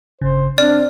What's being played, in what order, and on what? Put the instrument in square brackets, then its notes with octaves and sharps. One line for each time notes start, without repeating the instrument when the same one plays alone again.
[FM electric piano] G1 C#3 [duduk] C5
[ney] C4 [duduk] D4 [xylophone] D5 [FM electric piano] F6